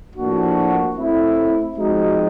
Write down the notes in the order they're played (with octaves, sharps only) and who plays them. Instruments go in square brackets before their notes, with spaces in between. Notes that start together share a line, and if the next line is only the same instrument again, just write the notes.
[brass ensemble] A2 F3 A#3 D4 F#4
A3 C4 E4
F3 G#3 C4 D#4 F#4